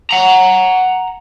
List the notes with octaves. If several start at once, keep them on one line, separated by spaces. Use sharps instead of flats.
F#5 A#5